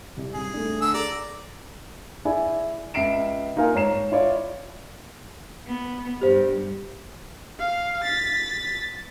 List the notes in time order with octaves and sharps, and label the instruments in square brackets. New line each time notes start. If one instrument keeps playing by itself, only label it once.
[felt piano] C2
[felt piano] C2 G2 [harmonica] G#4
[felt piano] A3 D4
[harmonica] D3 E6
[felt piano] G#4 [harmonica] D5 A#5
[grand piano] E4 G#4 D5 G#5
C#2 E5 C7 D7 E7
A#3 D#4 F4 A#4 F5 G#5
G#2 C#5 A#5 C7 E7
E4 F4 C#5 D5 F5
[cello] B3
[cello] G2 [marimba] G4 C5
[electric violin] F5
A6 B6